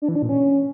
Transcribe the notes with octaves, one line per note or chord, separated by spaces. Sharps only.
D4
E3
D4
A#2
C#4